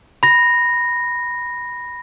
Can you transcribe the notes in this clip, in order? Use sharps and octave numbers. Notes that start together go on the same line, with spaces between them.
B5 A#6